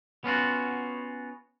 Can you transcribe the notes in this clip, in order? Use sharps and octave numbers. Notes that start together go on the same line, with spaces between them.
B3 C#4 F4 F#4